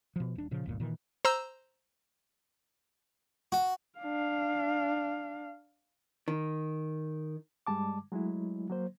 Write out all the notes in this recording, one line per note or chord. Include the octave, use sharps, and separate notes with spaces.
B2 F3
D#1 D4
A#2 C#3 F3
G1 D#2 A#2
A#2 D#3 E3
C5 A#5 E6
F#4
D4 F5
D#3
G2 G3 G#3 A5 D6
F#3 G#3 A3 E4
F#3 A#3 C5